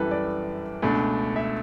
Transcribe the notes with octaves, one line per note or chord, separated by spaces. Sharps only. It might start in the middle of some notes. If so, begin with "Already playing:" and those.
Already playing: F#2 E3 G3 A4 B4
D5
C#2 B2 A3 D4
E5